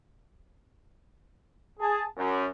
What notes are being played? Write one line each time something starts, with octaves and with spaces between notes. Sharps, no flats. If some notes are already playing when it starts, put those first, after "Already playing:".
G#4 A5
F#2